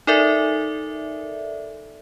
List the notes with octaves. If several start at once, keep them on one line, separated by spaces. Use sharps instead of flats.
D#4 A4 A#4 D5 E5